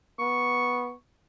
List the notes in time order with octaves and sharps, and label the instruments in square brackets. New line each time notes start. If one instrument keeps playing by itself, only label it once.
[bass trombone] B3 [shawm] C#6